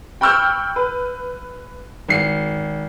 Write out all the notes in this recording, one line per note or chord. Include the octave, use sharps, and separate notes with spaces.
G5 B5 C#6 E6 F6 G6
B4
G#1 C7 C#7